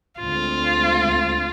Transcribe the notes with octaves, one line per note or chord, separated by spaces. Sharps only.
D2 D3 G#3 C4 F4